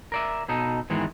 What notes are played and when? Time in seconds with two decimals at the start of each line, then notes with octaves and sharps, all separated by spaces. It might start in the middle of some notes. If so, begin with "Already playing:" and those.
0.12 A#4 D5 E5
0.49 B2 D#4 A4
0.90 E2 G#2 D#3 E3 G#3